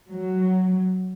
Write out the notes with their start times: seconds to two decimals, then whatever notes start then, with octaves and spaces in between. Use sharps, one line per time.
0.10 F#3